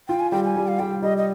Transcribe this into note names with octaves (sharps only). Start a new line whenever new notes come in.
F4 G5
G#5
G3 G5
G#5
G3
F5
G3 G5
G3 D#5
D#5